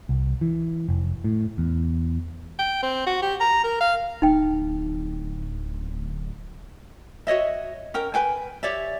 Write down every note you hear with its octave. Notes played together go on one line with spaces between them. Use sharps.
C2
E3
F1
A2
E2
G5
C4
F#4
G4
A#5
A#4
F5
D1 D#4 G5
F#4 C#5 D#5 E5
C#4 A#4 G5
B4 G5 G#5
G4 C#5 D5 E5